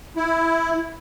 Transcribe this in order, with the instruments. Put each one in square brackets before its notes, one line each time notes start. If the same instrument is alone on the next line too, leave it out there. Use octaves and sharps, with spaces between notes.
[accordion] E4